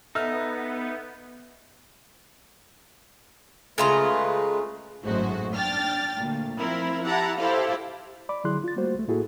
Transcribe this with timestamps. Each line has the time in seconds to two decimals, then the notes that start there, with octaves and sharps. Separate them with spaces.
0.15 B3 D#4 A4 E5 F6
3.78 C#3 G#3 A3 F4 B4 A#5
5.03 G#1 F#2 A2 G#3 F#4 C5
5.54 D4 G5 F6 A6
6.15 D2 A#2
6.58 F3 C4 E4 A#4
7.05 E4 G4 F#5 A5 A#5
7.39 E4 G4 A4 C5 F5
8.29 D5 B5 D6
8.44 D3 F#3 E4 G#4 C6 F#6
8.64 F4 A6
8.76 G3 A3 A#3 F#4 C5
8.95 C2 A3
9.08 A2 A#3 E4 F#4 G#4 A4